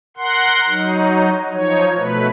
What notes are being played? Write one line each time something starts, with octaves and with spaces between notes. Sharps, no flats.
A#4 F#5 C6
F#3 D#4
F3 D#4 C#5
B2 A3 B4